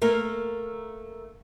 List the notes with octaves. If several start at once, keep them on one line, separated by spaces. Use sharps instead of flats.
A3 A#3 A#4